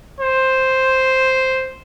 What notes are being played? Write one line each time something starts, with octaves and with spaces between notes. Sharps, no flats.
C5